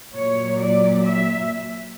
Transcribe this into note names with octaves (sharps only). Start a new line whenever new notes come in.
A#2 F#3 C#5
D5
E5